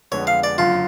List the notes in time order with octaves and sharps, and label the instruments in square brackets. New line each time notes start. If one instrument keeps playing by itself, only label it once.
[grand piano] F2 D3 G#3 B3 [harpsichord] C#5
[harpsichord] F5
D5
[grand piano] F#1 F#2 D3 [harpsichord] F4